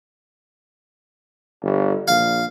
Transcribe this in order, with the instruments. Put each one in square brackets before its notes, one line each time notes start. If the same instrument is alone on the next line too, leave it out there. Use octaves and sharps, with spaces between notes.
[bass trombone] G1
[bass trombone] A#1 [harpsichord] F5